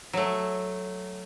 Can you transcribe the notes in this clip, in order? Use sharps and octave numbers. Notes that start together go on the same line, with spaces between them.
F#3 A3